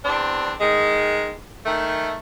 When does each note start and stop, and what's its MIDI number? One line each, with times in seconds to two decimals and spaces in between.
0.04 0.53 40
0.04 0.53 60
0.04 0.53 62
0.60 1.33 51
0.60 1.33 56
1.65 2.16 51
1.65 2.16 57